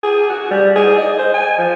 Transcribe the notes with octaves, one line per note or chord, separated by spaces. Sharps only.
G#4
F#4
G3
G#4
D#5
C5
G#5
F3